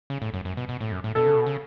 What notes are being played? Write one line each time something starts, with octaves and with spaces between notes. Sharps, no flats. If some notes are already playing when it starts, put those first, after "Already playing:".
C#3
A2
F#2
F#2
B2
B2
A2
F#2
A2
B2 A4
C#3
B2
C#3